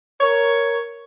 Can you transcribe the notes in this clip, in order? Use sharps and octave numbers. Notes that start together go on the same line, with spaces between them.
A#4 C#5